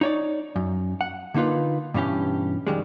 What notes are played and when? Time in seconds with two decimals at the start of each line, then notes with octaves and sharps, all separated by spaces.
0.01 D#4 C#5 D5
0.56 F#2
1.01 F#5
1.34 D3 A#3 D#4 F4 B4
1.94 G2 B2 E3 C#4 G4
2.67 F2 D#3 G3 G#3